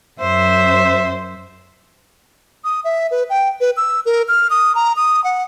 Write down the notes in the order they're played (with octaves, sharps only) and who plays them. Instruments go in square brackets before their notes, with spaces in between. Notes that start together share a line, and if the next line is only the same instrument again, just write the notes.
[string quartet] F#2 C5 [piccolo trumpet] E5
[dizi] D#6
E5
B4
G5
B4
E6
A#4
F6
D#6
A#5
D#6
F#5